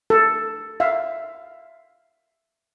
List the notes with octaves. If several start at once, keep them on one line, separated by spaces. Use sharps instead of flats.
A4
E5 F5